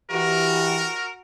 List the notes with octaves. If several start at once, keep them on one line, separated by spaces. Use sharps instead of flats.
E3 F#4 G4 A#4